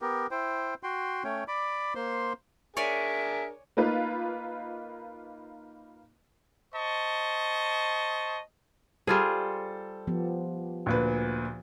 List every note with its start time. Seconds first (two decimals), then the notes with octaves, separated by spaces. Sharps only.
0.02 B3 G4 A#4
0.31 E4 C5 G5
0.83 F#4 G5 C6
1.24 A3 C#4 C#5 G5
1.48 D5 B5 D6
1.95 A#3 C5 C6
2.77 D4 G#4 A#4 C#5 D5 E5 G#5
3.77 A#3 D#4 F4 B4
6.74 C5 D#5 A5 C#6
9.07 G3 F4 G#4 A4 C5
10.07 F3 B3 G4
10.86 D2 A#2 B4